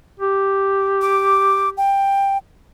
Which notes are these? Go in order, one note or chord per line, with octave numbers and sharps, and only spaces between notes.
G4
D6
G5